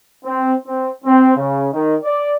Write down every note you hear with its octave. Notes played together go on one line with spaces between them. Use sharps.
C4
C4
C4
C#3
D#3
D5